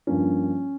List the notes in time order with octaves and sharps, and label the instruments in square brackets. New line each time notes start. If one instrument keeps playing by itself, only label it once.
[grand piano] G2 F3 A#3 C#4